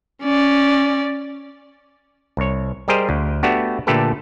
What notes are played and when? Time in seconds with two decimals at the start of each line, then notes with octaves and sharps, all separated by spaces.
0.23 C#4 D5
2.37 C2 C#5
2.88 G3 G4 G#4 A#4 C5 D#5
3.09 D2
3.43 A3 B3 D4 F#4 G4
3.87 A#2 D3 A3 G4 A4 B4